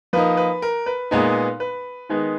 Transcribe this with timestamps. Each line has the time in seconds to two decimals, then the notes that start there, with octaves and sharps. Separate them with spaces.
0.13 F3 A#3 D#4 B4
0.37 B4
0.62 A#4
0.86 B4
1.11 A#2 G#3 B3 D#4
1.60 B4
2.09 D#3 G#3 B3 D#4